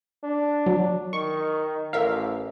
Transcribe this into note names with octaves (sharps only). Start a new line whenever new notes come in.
D4
F#3
D#3 C#6
A1 A#4 E5 F5